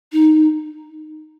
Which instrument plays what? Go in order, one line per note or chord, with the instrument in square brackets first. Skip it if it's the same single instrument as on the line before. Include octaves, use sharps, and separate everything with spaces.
[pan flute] D#4